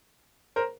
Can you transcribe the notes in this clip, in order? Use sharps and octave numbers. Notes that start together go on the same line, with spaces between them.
A#4 C5